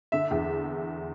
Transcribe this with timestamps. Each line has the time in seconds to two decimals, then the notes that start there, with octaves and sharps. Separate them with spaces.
0.12 D3 E5
0.31 E2